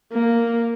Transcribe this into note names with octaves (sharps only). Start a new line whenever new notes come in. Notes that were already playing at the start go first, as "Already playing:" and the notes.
A#3